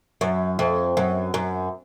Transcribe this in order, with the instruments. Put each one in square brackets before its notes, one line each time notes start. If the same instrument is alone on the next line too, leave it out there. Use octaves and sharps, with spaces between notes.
[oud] F#2
F2
F#2
F#2